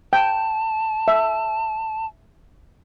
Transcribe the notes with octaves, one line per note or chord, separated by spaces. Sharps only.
G5 A5
E5